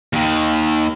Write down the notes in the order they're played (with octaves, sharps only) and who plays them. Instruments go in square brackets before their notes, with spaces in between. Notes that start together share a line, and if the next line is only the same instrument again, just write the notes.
[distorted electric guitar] D#2 D#3